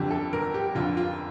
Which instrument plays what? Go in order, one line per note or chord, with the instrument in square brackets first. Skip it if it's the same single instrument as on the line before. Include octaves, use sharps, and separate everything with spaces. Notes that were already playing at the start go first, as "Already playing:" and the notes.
Already playing: [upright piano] G1 F2 D3 G4
A4
G1 A#4
G4
F2 D3 F4
F4